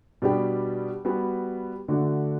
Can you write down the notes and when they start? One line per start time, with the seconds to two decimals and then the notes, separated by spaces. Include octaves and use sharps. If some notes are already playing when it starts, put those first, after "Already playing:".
0.22 B2 G3 B3 D4 G4
1.05 G3 B3 F#4
1.88 D3 A3 D4 F#4